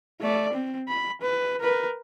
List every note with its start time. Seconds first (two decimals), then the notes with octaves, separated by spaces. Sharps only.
0.21 A3 D5
0.53 C4
0.88 B5
1.22 B4
1.60 A#4 B4